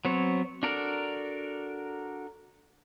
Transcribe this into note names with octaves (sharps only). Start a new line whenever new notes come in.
F#3 B3 C4 C#5
D4 F#4 A4 A#4 D5